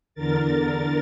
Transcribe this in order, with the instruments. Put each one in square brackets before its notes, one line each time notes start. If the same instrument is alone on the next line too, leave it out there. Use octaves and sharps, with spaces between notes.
[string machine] E2 D3 A#4 A6